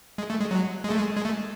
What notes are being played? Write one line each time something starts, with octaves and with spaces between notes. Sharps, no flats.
G#3
A3
G#3
F#3
G#3
A3
G#3
G#3
A3